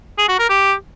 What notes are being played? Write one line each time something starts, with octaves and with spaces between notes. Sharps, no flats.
G#4
F#4
A#4
G4